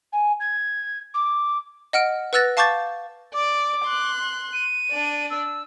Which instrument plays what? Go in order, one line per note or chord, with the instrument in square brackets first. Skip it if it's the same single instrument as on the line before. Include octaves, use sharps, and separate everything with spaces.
[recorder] G#5
G#6
D6
[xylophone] D#5 F#5 F6 D7
B4 F#5 E6 F#6 A6 A#6
F5 A5 C#6 D6 G6 A6
[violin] D5 [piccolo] D6
[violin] C6 F#6
[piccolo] D#7
[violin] D4 D5
[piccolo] E6